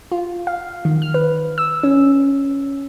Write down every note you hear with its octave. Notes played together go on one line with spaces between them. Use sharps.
F4
F5
D#3
F6
B4
E6
C#4